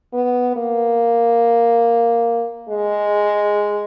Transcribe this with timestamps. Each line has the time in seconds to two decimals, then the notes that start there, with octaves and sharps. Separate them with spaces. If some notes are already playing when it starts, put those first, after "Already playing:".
0.13 B3
0.56 A#3
2.69 G#3